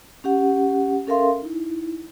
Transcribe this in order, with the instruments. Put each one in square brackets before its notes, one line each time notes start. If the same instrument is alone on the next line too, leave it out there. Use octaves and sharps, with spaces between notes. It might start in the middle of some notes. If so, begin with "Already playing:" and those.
[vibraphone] C#4 G4 F#5
C#4 A4 A#4 E5 F5 C6
D#4 E4